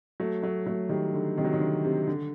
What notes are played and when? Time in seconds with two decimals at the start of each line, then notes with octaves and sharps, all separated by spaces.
0.20 F#3 A3
0.42 F#3 A3
0.67 F#3 A3
0.89 D#3 G3
1.13 D3
1.37 C3 D#3
1.45 F#3
1.53 D#3
1.60 D3
1.84 C3
2.08 D3